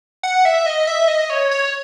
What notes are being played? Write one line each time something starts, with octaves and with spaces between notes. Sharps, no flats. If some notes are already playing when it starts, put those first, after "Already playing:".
F#5
E5
D#5
E5
D#5
C#5
C#5